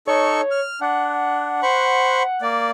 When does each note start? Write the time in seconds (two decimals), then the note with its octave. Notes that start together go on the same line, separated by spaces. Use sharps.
0.07 D#4 A4 C#5 C#6
0.51 F6
0.81 D4 F#5
1.63 C5 B5 C#6
2.42 A#3 D5